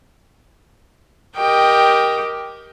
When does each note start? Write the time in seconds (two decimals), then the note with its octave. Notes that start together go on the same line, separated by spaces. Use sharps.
1.36 G4 A#4 D#5 G5